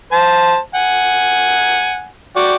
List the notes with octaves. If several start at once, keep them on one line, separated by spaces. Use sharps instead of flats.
C5 A5
F#5 G#5
F#4 D5 G5